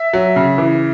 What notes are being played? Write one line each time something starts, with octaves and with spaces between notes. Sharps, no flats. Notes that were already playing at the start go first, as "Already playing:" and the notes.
Already playing: E5
F#3
C#3
E3